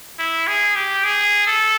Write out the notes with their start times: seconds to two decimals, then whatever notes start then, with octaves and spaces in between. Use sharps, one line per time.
0.19 E4
0.47 G#4
0.76 G4
1.04 G#4
1.47 A4